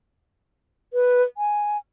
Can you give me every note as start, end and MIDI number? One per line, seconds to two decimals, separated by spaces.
0.93 1.22 71
1.37 1.78 80